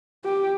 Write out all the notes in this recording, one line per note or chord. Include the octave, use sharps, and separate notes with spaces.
G4